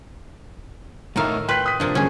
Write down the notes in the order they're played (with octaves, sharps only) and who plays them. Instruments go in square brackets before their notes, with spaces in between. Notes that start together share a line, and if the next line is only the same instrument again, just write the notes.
[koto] A2 D#3 F5 [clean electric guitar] A3 D#4 E5 [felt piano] A#5
[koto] B4 [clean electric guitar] G5 [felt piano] C6 F#6 B6
[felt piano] D#6 B6
[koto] C3 F3 A#3 [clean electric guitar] D4
[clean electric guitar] G2 D3 F#3 [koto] C#4 G#4